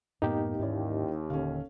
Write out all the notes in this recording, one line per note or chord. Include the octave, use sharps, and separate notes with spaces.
F#2 A2 A#3 B3 D#4 G4
D#2 G#2 E3 C#4 D5
D#1 D3 C#4 A4 F5